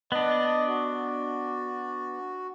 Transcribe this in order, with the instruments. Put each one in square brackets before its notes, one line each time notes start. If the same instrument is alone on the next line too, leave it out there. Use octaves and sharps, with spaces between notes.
[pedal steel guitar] B3 D4 [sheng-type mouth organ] D#5
[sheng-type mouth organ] F#4